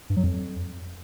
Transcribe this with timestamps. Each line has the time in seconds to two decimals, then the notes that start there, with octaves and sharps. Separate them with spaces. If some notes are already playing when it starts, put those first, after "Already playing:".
0.10 G2
0.17 F#3
0.24 F2